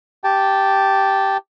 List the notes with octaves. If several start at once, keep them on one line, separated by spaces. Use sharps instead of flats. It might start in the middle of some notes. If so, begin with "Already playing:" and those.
G4 G5 A5